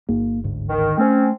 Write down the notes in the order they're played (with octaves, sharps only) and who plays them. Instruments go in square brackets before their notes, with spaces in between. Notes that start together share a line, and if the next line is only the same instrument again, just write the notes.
[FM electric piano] G1 [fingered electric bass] A#3
[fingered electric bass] D2 G#2
[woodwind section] D#3
[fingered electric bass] A3 [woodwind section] C4 C#4